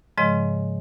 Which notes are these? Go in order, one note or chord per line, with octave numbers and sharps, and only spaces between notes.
G#2 C#3 F3 G#3 D#5